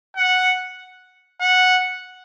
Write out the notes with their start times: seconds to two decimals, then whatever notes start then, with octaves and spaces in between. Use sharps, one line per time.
0.17 F#5
1.41 F#5